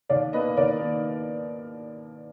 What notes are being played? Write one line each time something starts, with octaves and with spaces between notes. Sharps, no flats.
D#2 D5 F5
D#3 A#3 B4 D#5
D#2 A#4 D5
D#3 A#3